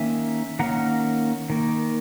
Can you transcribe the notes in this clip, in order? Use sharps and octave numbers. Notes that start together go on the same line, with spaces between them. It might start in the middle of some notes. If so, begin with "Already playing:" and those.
Already playing: D#3 A#3 C#4 E5 G#5
D#3 A#3 C#4 F#5 A#5
D#3 A#3